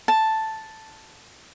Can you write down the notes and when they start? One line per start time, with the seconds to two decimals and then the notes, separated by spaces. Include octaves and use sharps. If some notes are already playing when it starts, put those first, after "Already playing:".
0.08 A5